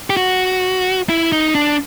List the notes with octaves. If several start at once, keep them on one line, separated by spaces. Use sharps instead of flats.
G4
F#4
E4
D#4
D4